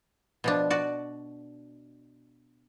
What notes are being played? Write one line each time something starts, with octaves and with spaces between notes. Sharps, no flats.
B2 F3 D4
F#4 D5